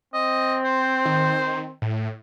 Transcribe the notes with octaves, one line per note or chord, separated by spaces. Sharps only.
C4 D#5
C5
D#3
A2